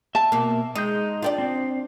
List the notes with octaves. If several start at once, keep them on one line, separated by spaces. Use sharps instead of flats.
E5 A5
B2 A#3
G#3 D#4 D#6 G6
D4 F4 A#4 D5 G5
C4